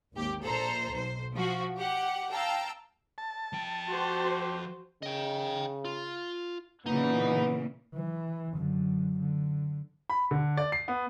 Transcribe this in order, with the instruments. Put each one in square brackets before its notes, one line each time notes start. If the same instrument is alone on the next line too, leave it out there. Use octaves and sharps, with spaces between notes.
[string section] G#1 D#2 G4
A#1 A4 C5 A#5
B1 C5
F3 F#4
G4 F#5
F5 G5 A5 A#5 E6
[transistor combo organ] A5
[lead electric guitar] F3 G5
[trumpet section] A3 G4 C6 [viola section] F#4 C5
[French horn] C#3 [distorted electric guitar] D#5 G5
[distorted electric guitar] F4
[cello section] A#2 C#3 E3 [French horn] B3 [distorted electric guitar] D#4
[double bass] E3
F#2 D3
D3
[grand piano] B5
D3
D5
C7
B3